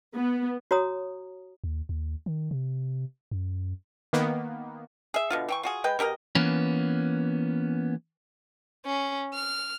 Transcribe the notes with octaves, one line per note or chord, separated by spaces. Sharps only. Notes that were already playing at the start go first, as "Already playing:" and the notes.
B3
F#4 C#5 A#5 D#6
D#2
D#2
D#3
C3
F#2
D#3 A#3 B3
G#4 E5
B2 D3 F4
E3 G5 C#6
F4 F#4 G#4
G#3 B4 G5
B2 G4 A#4 D#5
E3 A#3 B3 C#4
C#4
F6